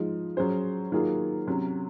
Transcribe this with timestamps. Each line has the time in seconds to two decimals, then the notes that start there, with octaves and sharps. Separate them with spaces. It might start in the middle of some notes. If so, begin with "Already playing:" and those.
Already playing: F3 G#3 D#4
0.37 F#3 C#4 G#4 C5
0.92 D#3 F#3 A#3 F4 G#4
1.47 C3 F#3 C#4